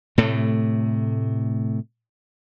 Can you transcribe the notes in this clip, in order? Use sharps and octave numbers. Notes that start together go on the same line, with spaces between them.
A2 C3 A3